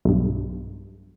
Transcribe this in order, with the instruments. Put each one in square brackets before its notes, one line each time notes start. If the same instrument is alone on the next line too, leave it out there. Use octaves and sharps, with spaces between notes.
[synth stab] B1 G2